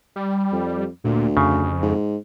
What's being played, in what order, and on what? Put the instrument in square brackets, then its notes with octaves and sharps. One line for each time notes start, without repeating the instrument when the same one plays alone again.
[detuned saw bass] G3
[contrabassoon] F2
[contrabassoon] D2 [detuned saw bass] A#2
[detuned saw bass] F2 [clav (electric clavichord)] C#3
[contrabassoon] G#2